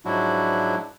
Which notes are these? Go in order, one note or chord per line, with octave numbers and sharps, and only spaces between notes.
G#2 F3 F#3 D4 E4 F#4